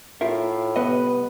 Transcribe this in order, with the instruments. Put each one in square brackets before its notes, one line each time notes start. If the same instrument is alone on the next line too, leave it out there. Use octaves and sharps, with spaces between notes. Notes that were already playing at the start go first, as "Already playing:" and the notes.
[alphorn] A2 [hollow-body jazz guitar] F4 A#4 E5
[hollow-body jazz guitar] C2 B3 D#5 [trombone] B4